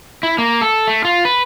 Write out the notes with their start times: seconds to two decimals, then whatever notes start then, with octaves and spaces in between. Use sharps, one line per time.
0.23 E4
0.38 A#3
0.61 A4
0.87 A3
1.05 F4
1.25 B4